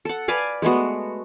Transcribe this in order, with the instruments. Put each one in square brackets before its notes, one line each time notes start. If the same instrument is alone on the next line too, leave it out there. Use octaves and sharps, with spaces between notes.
[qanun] A4 F#5
B4 D5 F5 G#5
G#3 A3 B3 F#4